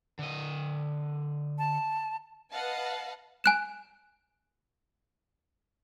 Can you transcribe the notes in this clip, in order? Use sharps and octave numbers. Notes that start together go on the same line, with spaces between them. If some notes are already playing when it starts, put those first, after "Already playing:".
D3 D#5
A5
B4 D#5 F5 F#5 A5
G#5 F#6 E7